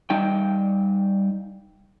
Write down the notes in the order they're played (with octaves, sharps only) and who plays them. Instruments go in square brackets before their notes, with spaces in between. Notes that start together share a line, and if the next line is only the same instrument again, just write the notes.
[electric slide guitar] G3 D#4 G5